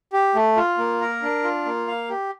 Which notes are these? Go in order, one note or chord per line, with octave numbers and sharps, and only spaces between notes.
G4
A3
F4
A#3
A#4
D4
F4
A#3
F5
G4